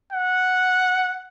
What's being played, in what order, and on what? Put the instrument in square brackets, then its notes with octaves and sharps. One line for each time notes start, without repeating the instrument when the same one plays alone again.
[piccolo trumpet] F#5